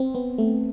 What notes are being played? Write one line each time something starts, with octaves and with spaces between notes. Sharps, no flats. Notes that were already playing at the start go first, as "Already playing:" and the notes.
Already playing: C4
B3
A3